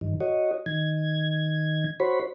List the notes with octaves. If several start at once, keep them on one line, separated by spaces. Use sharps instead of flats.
G2 D#3
F#4 C#5 D#5
D#3 G#6
F#4 C5 C#5 B5